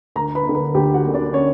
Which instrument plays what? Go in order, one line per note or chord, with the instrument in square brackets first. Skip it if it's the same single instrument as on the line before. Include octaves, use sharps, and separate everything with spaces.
[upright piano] D2 A#4 A#5
B4 B5
D3 A#3
B4 B5
D2 G4 G5
F#4 F#5
D3 A#3
D4 D5
C#4 C#5